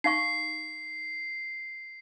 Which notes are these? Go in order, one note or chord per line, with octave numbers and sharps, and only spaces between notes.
D#4 F5 C#6 C7